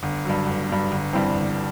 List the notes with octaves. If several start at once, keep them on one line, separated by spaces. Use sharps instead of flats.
G1
G2 F#3
G1
G2 F#3
G1
G2 E3 G3 C4
G1